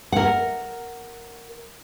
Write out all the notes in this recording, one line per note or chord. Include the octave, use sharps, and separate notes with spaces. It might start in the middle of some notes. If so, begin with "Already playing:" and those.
A#4 F#5